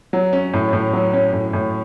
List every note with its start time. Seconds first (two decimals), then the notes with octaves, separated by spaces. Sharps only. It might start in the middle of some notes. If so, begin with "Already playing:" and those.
0.13 F#3
0.33 C#4
0.54 A2
0.73 A2
0.93 F#3
1.13 C#4
1.33 A2
1.53 A2